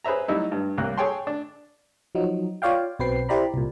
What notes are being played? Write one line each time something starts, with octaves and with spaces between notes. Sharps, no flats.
G#4 B4 C5 E5 A#5
F#3 G3 D#4 E4
G2
C2 A#3 F#6
G#4 A4 C#5 G5 A5 C6
D4
F3 F#3 D#4
F4 C#5 D5 F5 G5
B1 B2 C4 B4 G5 C7
E4 G4 C5 D5 A#5 B5
C2 A#2